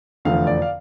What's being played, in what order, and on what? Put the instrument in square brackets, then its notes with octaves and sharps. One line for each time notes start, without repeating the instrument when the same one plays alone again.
[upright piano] F1 E2 D3 F3 A3 F5
D5
F5